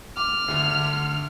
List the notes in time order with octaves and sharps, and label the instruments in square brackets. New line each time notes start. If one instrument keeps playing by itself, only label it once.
[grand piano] D6 [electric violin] F6
[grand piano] D2 D3